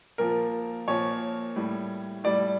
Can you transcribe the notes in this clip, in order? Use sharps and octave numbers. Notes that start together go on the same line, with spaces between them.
A#2 F3 A#4
A#2 F3 C#5
A2 G3
A2 G3 D5